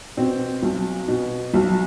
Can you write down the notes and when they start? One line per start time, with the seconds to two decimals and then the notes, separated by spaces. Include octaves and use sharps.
0.17 B2 C4
0.63 B1
1.08 B2
1.54 B1